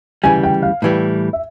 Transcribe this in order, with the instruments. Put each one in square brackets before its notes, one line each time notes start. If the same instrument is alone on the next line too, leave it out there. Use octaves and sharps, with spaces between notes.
[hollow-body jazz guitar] D2 C#3 E3 G3 [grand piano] G#5
[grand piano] G5
F5
[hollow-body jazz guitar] A2 E3 G3
[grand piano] E5